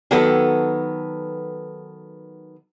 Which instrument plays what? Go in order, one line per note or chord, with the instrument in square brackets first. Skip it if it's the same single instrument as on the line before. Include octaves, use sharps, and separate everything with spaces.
[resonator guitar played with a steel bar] D#3 F#3 B3 A4 B4